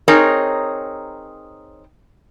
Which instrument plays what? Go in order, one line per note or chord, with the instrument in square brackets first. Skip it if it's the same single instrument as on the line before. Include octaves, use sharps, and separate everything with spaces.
[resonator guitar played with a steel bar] C4 D#4 G#4 A#4 C#5